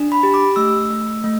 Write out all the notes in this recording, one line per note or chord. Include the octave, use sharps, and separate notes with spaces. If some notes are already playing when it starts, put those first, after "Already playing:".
Already playing: D4
B5
G4
D6
A3 E6
A3
A3